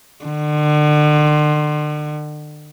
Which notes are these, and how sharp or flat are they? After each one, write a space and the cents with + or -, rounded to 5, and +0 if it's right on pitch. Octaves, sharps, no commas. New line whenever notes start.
D3 +40